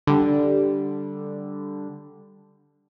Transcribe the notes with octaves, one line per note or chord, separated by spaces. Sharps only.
D3 G3